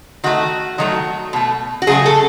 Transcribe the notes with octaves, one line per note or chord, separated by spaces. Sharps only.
D#3 A3 F#4
D#3 F#3 A3
B2 A3
F#4
C#3 F#3 A3 G#4
A4